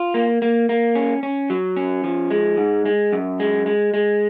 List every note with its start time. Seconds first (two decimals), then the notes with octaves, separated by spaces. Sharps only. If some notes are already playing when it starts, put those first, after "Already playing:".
Already playing: F4
0.14 A#3
0.42 A#3
0.69 A#3
0.95 C#4
1.23 C#4
1.50 F#3
1.77 C#4
2.04 F3
2.31 G#3
2.57 G#2
2.85 G#3
3.13 F#2
3.40 G#3
3.66 G#3
3.94 G#3